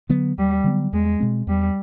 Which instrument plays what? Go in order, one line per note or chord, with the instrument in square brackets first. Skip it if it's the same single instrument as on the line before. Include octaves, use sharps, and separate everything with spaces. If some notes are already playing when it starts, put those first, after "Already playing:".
[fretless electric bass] D3 F#3 B3
[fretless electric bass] D#2 [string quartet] G3
[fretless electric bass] D3 F#3 B3
[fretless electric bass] E2 [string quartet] G#3
[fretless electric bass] B2 G#3 C4
[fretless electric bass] E2 [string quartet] G3